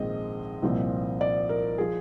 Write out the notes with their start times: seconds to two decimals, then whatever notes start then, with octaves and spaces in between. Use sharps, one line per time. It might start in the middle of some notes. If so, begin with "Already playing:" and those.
Already playing: A#1 G#2 D#3 G#3 C4 D#5
0.62 C2 A#2 F3 C4
1.21 D5
1.49 A#4
1.78 F3 G#4